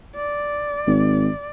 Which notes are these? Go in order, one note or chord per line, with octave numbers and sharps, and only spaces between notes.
D5
G#1